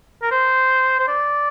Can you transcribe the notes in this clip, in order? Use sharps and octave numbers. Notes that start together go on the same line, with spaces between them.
A#4
C5
C5
D5